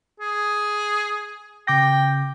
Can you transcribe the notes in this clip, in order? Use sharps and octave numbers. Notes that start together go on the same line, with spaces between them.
G#4
C#3 G5 D6 A#6